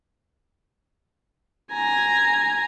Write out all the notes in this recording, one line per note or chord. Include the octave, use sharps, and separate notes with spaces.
G#5 A#5